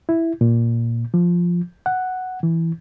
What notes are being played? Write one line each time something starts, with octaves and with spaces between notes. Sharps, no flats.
E4
A#2
F3
F#5
E3